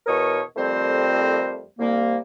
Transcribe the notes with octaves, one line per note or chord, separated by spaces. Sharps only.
E2 B2 A#4 C#5 C#6 D#6
F2 G3 A3 C4 A#4 C5
C2 A#3